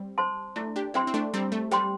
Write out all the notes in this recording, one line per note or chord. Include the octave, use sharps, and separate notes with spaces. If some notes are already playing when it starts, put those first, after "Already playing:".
Already playing: G3 C4
C5 A5 C6
A3 D4 E4
D4 G4
C4 E4 C5 G5 C6
C4
A3 D4
G3 C4 E4
A3
G3 C5 G5 C6